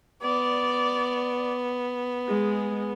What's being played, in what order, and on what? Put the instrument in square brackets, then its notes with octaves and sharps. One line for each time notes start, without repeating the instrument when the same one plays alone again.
[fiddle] B3 [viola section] D5
[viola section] G#3